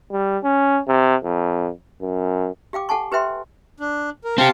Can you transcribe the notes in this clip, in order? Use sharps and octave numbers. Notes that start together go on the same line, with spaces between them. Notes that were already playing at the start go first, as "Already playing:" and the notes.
G3
C#4
C3
F2
F#2
G4 F5 G5 D6
A4 F#5 G#5 A5 C#6
G4 B4 C5 E5 G5 C6
D4
A#4
C4 G4 F5 A5 C6